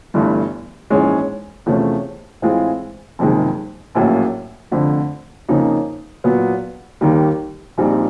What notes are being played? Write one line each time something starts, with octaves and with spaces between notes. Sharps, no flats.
G1 G2 E3 A3
A#1 G#2 E3 G#3 C#4
E2 C3 F3 A3 C#4
A2 E3 G#3 C4 F4
F#1 F2 C3 D#3 G#3
A#1 A2 F#3 A#3 C#4
F1 F2 D3 F3
F2 C#3 F3 A#3 D#4
A#2 F#3 B3
D#2 D#3 G3 A#3
A#1 A#2 G3 C4 D#4